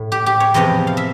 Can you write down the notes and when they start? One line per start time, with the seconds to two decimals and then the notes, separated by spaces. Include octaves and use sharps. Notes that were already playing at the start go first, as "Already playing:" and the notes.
Already playing: A2
0.12 G4
0.26 G4
0.40 C#5
0.54 E2 C3 F3 D#5
0.87 F5
0.97 E5